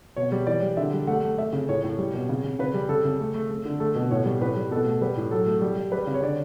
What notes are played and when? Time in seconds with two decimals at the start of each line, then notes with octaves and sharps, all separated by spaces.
0.16 B2 C#5
0.32 G3
0.47 E3 D5
0.62 G3
0.77 D3 E5
0.93 G3
1.07 A3 F#5
1.23 A3
1.38 A3 E5
1.53 C#3
1.69 A2 C#5
1.84 A2
1.98 G3
2.13 B2
2.29 C#3
2.44 C#3
2.59 C#3 B4
2.74 G3
2.89 C#3 A4
3.05 C#3
3.20 A3
3.35 A3
3.51 A3
3.65 D3
3.80 A3 A4
3.95 B2
4.11 A2 C#5
4.26 G3
4.42 A2 B4
4.56 G3
4.71 B2 A4
4.86 A3
5.01 G3 B4
5.17 A2
5.31 F#3 A4
5.47 A3
5.62 G3
5.77 G3
5.92 G3 B4
6.07 C#3
6.14 C#5
6.23 D3 D5